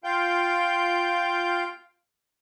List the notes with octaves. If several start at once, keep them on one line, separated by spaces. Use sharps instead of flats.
F4 F5 G5 G6